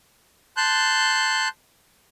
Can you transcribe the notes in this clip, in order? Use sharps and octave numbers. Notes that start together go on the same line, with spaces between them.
A5 C6 F#6 G6